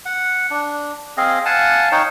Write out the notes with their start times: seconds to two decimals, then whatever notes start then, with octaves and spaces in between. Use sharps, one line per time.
0.05 F#5
0.51 D4
1.17 C4 G#4 D#5 F5
1.45 F5 F#5 G#5 A5
1.92 D#4 C#5 G5